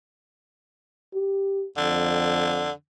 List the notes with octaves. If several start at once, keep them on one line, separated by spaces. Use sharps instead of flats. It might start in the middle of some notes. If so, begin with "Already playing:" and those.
G4
F2 D3